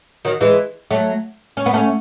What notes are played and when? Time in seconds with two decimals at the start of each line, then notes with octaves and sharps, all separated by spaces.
0.25 D#3 F#3
0.41 E3 G#3
0.91 F#3 A3
1.57 C#4
1.66 B3
1.73 A3 C#4